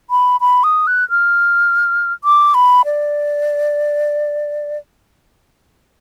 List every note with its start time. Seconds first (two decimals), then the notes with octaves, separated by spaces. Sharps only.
0.10 B5
0.41 B5
0.64 D#6
0.87 F#6
1.10 F6
2.24 D6
2.54 B5
2.85 D5